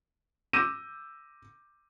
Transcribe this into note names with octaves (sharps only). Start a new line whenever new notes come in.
D6 E6 G6 A#6 D#7 E7